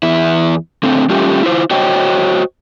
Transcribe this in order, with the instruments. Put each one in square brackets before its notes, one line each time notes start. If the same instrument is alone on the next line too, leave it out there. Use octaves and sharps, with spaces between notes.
[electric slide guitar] E2 E4
D3 A3 C4
G3 A3 C#4 F4 G4
E4 F4 C5
F#4 C5 C#5 D#5 G5